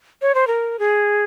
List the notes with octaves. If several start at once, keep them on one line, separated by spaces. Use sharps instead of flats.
C#5
C5
A#4
G#4